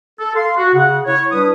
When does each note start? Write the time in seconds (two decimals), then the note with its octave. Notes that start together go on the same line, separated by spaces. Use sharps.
0.19 A4
0.34 F5 C6
0.57 F#4
0.73 C#3 F#5
1.05 E4 C#5
1.31 G3 D4 E4 B4 D#6